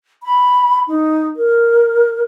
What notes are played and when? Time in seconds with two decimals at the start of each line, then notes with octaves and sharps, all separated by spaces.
0.23 B5
0.88 D#4
1.36 A#4